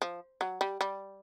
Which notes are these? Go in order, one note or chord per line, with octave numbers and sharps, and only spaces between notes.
F3
F#3
G3
G3